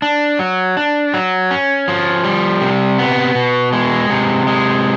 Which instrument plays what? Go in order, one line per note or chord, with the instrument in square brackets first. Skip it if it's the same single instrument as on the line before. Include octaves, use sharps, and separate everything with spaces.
[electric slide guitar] D4
F#3
D4
F#3
C#4
F3
G3
C3
B3
B2
G#3
C3
G#3